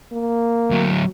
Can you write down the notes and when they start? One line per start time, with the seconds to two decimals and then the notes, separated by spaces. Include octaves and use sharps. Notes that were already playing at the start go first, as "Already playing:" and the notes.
0.12 A#3
0.70 D2 F#3